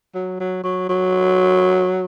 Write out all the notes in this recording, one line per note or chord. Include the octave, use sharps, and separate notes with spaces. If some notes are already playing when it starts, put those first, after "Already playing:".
F#3
F#3
F#3
F#3